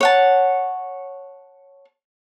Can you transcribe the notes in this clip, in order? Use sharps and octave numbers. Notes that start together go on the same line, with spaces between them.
C#5 F#5 A5